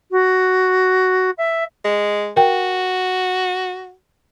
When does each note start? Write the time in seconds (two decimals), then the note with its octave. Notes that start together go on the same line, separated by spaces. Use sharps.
0.11 F#4
1.38 E5
1.85 G#3
2.36 F#4 A#4 G5